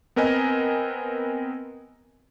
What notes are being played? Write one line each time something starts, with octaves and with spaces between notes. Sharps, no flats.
B3 C4 A#4 B4 D#5 G#5